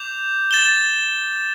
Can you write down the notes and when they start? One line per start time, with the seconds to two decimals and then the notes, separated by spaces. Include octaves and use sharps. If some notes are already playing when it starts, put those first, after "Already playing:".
Already playing: D6 G6 F7
0.51 A6 E7 G7